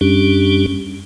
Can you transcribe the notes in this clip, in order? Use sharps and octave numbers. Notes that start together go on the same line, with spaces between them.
F#2 G3 C#4 D4 G4